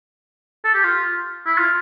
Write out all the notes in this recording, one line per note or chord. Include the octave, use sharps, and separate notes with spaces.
A4
G4
F4
E4
F4